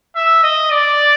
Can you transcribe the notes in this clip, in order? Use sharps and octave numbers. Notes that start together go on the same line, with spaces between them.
E5
D#5
D5